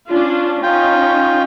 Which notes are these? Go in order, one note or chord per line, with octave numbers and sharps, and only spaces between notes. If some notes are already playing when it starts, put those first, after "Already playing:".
C#4 D4 F4
C#4 D#4 F4 G5